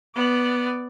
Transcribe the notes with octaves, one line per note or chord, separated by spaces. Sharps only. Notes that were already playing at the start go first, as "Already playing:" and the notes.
B3 D5